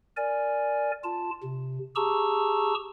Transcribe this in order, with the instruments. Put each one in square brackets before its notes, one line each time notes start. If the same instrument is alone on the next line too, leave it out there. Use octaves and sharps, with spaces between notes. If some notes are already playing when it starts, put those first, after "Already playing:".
[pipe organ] A#4 D5 G#5
F4 A5
C3
G4 G#4 A5 A#5 C#6 E6